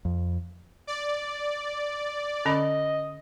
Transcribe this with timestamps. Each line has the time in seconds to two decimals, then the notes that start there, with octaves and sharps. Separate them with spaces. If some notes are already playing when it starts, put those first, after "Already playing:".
0.05 F2
0.87 D5
2.46 D3 C#4 D#5 B5